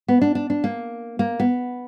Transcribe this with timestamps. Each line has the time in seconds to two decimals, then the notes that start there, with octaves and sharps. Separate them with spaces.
0.08 B3
0.21 D4
0.35 D4
0.50 D4
0.64 A#3
1.19 A#3
1.40 B3